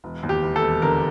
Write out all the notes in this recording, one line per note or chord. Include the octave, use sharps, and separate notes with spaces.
E1
D#2
G4
E1
A4
E1
D3 A#4